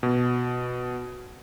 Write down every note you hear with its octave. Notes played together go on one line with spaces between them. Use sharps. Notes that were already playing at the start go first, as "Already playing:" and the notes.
B2